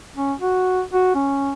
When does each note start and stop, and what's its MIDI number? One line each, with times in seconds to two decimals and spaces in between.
0.16 0.33 61
0.40 0.82 66
0.93 1.13 66
1.15 1.53 61